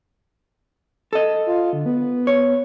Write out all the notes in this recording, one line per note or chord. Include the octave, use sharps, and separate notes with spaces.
A4 D#5
F4
D3
B3
C#5